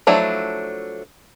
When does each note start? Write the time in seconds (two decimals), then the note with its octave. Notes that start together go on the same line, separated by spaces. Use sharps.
0.07 F3 F#3 A3 D4 E4